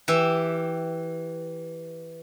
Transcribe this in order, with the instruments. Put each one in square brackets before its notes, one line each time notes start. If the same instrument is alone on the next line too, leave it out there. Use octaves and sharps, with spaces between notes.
[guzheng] E3 G4 E5